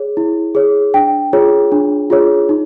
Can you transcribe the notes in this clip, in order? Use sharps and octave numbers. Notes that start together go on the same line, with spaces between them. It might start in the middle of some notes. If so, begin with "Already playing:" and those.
Already playing: G#4 C#5
E4
G#4 C#5
D4 G5
F4 G#4 C#5
D4
F4 G#4 C#5
D#4